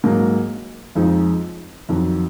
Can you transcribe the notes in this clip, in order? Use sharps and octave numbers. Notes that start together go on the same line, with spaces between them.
G#2 F#3 A#3
F2 F3 G#3 D#4
F2 D#3 F#3